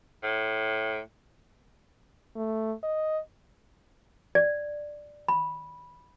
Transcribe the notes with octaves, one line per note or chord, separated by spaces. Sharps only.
A2
A3
D#5
D5
B5